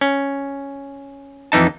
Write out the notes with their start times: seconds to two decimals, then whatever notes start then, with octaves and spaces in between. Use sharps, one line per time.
0.01 C#4
1.52 F2 E3 D#4 A5